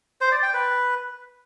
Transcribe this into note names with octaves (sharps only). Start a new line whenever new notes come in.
C5
D5
G5
B4